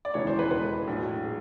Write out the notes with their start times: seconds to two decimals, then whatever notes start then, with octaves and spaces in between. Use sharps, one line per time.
0.05 D5
0.14 E1 D#2 C#3 E3 G#3 C#5
0.27 C5
0.39 B4
0.51 B4
0.87 A#1 A2 F#3
1.24 G#4